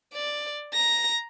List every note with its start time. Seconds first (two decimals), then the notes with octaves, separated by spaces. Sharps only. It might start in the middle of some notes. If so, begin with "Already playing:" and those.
0.14 D5
0.73 A#5 A#6